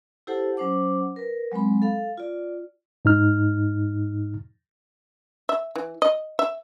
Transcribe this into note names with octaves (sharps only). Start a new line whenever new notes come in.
E4 G4 A4 C5 F#5 A5
F#3 C#4 C5 F#5 D6
A#4 B4
F#3 G#3 C4 B5
A4 F5
F4 D5
G#2 D#4 F6
E5
E3
D#5
E5